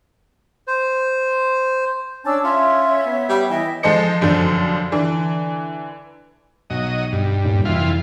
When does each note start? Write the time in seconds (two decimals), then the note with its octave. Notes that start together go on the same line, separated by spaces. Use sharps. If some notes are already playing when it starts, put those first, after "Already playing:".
0.67 C5
2.25 C#4 D4 C#5 A5 E6
2.43 C#4 F4 C#5 E5
3.05 B3
3.29 G3
3.50 E3 E4 D#5 G5
3.83 F3 G#3 A4 C5 D#5 C#7
4.21 F1 F#2 D3 F3
4.92 D3 E3
6.70 B1 F#3 D#5
7.12 G2
7.45 D#1
7.65 C2 F2 E3 F4